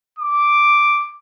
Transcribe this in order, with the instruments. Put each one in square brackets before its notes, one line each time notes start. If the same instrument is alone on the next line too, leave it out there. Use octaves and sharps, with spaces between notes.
[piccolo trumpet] D6